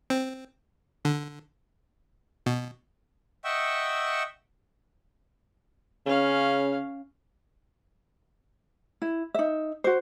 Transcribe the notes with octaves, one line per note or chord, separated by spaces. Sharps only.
C4
D3
B2
D#5 E5 F#5 G5 C#6 E6
C#3 C#4 F5
E4
D#4 E5
F#4 C5